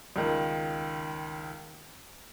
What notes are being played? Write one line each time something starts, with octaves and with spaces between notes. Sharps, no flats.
C#2 D#3